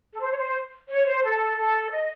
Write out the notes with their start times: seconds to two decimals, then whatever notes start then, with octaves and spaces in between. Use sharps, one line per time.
0.13 A4
0.20 C5
0.32 C#5
0.37 C5
0.88 C#5
1.06 C5
1.23 A4
1.57 A4
1.91 D#5